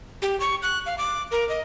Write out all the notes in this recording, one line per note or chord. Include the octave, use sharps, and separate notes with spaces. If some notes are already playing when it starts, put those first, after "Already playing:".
G4
C#6
F#6
F5
D6
A#4
D#5